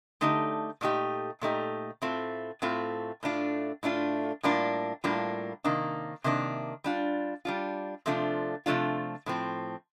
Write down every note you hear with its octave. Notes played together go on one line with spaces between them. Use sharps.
D3 A3 D#4 G4
A#2 A3 D#4 G4
A#2 A3 D#4 G4
A2 A3 C4 F4
A2 A3 C4 F4
A2 A3 D4 F4
A2 A3 D4 F4
A2 G3 A#3 D4 F4
A2 G3 A#3 D4 F4
C3 D#3 A#3 D4
C3 D#3 A#3 D4
G3 D4 F4
G3 D4 F4
C3 F3 A3 D4 F4
C3 F3 A3 D4 F4
A2 F3 C4